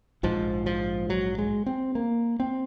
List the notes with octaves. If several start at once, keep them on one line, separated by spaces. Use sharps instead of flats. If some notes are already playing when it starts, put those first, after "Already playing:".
A#1 G#2 F3
F3
F#3
G#3
C4
A#3
C4